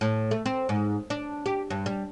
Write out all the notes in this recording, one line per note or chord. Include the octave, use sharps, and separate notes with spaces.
A2
A3
C4
G#2
D4
G4
G2
G3